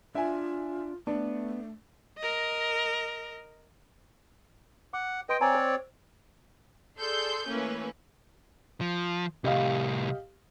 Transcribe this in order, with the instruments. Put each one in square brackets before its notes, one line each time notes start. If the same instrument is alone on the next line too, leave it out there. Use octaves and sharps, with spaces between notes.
[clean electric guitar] D4 [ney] F4 [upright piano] E5 G#5
[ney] A3 [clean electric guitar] B3 [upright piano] D4
[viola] A#4 D#5
[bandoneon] F#5 [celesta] D6
[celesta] B4 C6 D7 [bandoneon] D#5 G5
[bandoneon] C4 C#5 D5 [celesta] G#5 A#5
[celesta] C5
[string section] G#4 A4 D5 C6 E6 G6
E3 A3 A#3 C#4 B4
[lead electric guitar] F3
[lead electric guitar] C2 A2 [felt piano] G4 D#5 F5